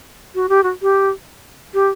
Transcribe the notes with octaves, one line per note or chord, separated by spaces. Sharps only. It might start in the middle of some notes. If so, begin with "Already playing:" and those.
F#4
G4
F#4
G4
G4